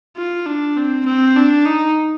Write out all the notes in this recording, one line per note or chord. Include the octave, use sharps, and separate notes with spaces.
F4
D4
C4
C4
D4
D#4